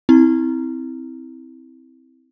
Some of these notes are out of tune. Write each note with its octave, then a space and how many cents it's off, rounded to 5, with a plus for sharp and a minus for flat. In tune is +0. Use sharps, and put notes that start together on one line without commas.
C4 -5 E4 -20 A#5 +0